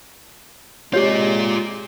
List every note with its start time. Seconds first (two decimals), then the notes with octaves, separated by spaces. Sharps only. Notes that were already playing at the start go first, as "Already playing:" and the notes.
0.93 C3 G#3 F4 G4 C#5 D5